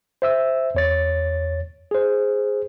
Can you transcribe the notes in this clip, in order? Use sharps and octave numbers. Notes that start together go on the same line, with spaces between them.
C5 E5 E6
E2 C#5 A6
G#4 C5